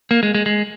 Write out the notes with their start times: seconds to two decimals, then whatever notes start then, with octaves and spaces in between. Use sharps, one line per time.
0.11 A#3
0.23 G#3
0.35 G#3
0.46 G#3